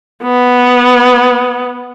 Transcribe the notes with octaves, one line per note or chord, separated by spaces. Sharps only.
B3